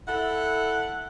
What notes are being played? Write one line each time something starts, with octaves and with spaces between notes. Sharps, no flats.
E4 A4 F#5